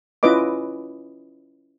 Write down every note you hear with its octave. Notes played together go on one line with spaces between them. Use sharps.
C#4 E4 F4 B4 D#5 D6